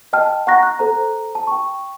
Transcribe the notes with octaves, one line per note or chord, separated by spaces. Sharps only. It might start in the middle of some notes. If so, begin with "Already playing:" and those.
D#5 G5 A5 F6
F#5 A#5 C#6 F#6 A#6
F#6
A4 C5 A#5
A5
G5 C#6